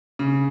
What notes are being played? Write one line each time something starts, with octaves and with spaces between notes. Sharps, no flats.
C#3